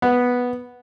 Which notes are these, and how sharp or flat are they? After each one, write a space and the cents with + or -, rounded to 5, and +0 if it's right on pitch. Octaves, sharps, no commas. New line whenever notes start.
B3 -5